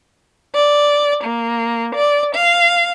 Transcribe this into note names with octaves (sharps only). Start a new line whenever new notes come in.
D5
A#3
D5
F5